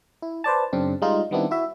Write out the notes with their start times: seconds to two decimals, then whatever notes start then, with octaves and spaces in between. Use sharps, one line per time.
0.22 E4
0.44 B4 C5 D5 A5
0.73 F#2 C#3 C4 D4
1.02 G3 G#3 D#4 F4
1.31 D#3 G3 B3 C4 D4 E4
1.51 E4 F#4 E5